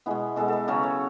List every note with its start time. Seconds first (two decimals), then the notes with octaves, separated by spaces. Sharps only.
0.06 B2 G#3 B3 E4
0.36 B2 G#3 B3 A4
0.48 A4 B4
0.68 C#3 F#3 C#4 A4
0.83 C#5